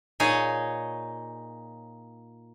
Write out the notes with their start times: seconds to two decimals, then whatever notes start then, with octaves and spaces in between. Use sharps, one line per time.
0.20 A#2 D#4 G#4 C#5